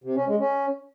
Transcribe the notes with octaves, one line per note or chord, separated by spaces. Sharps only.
C3
C#4
G#3
C#4